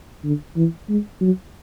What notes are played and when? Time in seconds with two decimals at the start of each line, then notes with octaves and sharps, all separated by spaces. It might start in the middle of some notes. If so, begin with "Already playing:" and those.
0.24 D3
0.56 E3
0.89 G#3
1.21 F#3